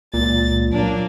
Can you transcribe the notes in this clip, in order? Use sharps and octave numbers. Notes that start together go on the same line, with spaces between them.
C#2 A#2 A6
F#3 A#3 D4